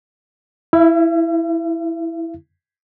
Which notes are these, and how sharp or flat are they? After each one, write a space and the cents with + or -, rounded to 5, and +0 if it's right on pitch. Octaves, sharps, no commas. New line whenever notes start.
E4 +0 E5 +45